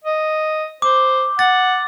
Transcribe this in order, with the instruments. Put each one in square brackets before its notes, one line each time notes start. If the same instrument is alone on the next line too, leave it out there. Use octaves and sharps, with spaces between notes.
[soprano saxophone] D#5
[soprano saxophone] C5 [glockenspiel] D6
[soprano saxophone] F#5 [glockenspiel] A6